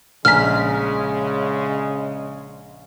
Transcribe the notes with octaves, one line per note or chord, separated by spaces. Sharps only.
A#1 C#3 G#3 G#5 A#5 F6 B6